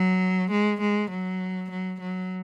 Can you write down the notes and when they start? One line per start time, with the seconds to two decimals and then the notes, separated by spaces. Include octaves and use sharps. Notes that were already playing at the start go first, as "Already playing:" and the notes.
Already playing: F#3
0.51 G#3
0.81 G#3
1.11 F#3
1.70 F#3
2.00 F#3